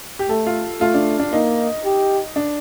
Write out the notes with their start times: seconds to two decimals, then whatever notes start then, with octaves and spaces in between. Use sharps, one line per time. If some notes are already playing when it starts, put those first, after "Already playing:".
0.19 G4
0.29 A3 A4
0.46 F4
0.80 A3 F4
0.94 D4
1.19 D4
1.32 A#3 D#4
1.85 G4
2.36 D4